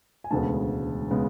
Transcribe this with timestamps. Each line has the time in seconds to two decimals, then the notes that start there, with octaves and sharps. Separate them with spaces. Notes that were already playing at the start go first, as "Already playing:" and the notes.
0.24 G#5
0.31 E1 D2 C#3 G#3 B3 A5
1.11 C#3 G#3 B3